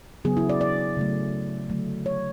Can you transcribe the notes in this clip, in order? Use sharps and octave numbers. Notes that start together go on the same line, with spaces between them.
C#3 F#3 B3 G#4
E4
D5
D5
C#3 F#3 A3
D3 F#3 A3
C#5